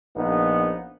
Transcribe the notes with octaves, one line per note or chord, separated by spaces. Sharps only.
A#1 B3 D#4